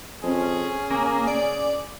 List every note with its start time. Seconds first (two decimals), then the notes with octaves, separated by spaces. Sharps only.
0.23 F2 C#4 G#4
0.90 C#3 A#3
1.27 D5